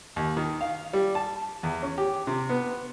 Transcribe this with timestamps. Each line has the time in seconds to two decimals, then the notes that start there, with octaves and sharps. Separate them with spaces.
0.16 D#2
0.37 D#3
0.61 F5
0.93 G3
1.15 A5
1.63 E2
1.83 C#4
1.98 G4
2.27 C3
2.49 B3